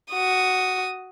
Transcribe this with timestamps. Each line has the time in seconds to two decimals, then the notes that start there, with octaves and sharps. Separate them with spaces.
0.10 F#4 D#6